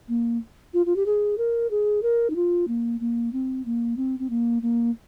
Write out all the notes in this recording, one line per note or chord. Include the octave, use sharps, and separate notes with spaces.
A#3
F4
F4
G4
G#4
A#4
G#4
A#4
D#4
F4
A#3
A#3
C4
A#3
C4
C4
A#3
A#3